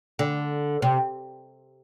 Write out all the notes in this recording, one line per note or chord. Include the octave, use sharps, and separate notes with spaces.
D3
C3